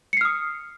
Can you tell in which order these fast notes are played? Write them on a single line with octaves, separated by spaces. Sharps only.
C#7 C7 F6 D#6